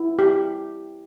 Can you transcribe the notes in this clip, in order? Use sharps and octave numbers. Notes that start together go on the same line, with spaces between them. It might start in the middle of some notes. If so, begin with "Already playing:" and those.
Already playing: E4
G4